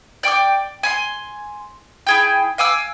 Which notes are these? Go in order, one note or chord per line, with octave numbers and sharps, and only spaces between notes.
D5 G5 C#6 D6
G#5 B5 C6
E4 G#4 G5
F5 G#5 D6 E6